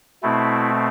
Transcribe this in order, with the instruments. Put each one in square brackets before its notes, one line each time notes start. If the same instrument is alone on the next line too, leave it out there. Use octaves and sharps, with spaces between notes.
[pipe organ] B2 A3 C4 E4